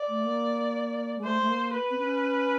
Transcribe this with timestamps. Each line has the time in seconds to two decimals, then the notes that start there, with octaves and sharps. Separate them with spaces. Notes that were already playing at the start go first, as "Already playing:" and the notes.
Already playing: D5
0.08 A3
0.24 A#3
1.18 G#3
1.24 A3 C5
1.42 A3
1.49 A#3
1.74 B4
1.90 C4
1.98 C#4